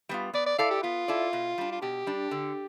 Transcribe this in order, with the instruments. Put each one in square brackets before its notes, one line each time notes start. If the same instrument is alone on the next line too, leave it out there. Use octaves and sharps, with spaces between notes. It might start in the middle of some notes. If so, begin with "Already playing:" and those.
[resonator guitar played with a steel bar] G3 B3 F4
[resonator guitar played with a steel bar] B3 [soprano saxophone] D5
[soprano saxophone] D5
[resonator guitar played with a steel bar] E4 A4 D5 [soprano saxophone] F5
[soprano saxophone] G4
[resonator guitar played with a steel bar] B3 [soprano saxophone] F4
[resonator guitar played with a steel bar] E4 A4 D5
B2
G3 D4
[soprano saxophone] F4
[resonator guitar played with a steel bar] B2 [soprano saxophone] G4
[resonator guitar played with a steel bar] G3 D4
D3